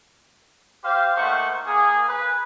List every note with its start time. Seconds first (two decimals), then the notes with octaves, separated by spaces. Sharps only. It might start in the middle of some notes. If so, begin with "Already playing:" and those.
0.83 G4 C5 F5
1.16 A3 A#3 D#4 C5 F#5 C#6
1.66 A#3 G#4
2.07 B4